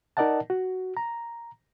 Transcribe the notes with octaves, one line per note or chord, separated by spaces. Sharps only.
D#4 A#4 D5 D#5 F#5 A5
F#4
A#5